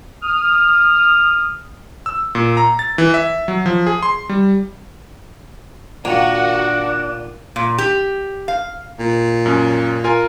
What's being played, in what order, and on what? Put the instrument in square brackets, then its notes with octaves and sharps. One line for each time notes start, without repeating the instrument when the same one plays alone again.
[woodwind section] D#6 F6
[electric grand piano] E6
A#2
A#5
A6
E3
E5
F#3
F3
G#4
C6
G3
[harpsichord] A#2 D#3 [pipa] A#3 [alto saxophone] D4 [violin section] F#4
[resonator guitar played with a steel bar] A#2
G4
F5
[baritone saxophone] A#2
[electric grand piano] F#2 C#4
F4 A#4 G#5